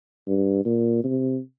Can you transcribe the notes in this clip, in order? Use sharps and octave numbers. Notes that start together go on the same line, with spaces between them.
G2
A#2
C3